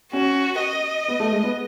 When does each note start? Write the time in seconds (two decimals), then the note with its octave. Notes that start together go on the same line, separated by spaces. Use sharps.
0.13 C#4 F#4
0.60 D#5
1.08 B3
1.20 A3
1.32 G#3
1.44 B3